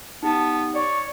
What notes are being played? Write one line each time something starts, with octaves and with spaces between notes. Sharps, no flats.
B3 D#4 G4 A5
C#5 D5 C#6